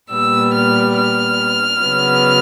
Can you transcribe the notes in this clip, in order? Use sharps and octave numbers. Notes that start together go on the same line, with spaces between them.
A#2 G3 B3 E6
F6
F6
C#3 F#3 B3